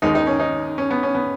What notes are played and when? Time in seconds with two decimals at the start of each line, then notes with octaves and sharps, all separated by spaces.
0.02 D#2 D#3 G#3 D#4
0.15 D#4
0.27 C#4
0.40 D#4
0.78 C#4
0.91 B3
1.03 C#4
1.15 B3